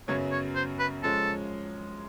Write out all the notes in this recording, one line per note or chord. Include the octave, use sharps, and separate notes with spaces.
F#2 C#3 F#3 B3 C#5
C#5
C5
B4
F3 G#3 C#4 A4